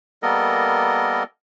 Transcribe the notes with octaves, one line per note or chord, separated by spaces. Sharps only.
G3 A#3 B3 A4 A#4 D#5